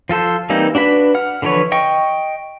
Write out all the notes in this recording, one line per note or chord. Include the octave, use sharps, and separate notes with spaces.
F3 F4 A4 C5
E3 G3 A#3 C4 D#4
D4 F#4 B4 B5
F#5 F6
D3 E3 F3 B4 C#5
D#5 G5 C#6